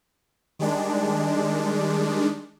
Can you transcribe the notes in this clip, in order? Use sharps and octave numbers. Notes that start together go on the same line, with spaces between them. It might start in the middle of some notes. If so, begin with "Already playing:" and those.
D#3 G3 G#3 D4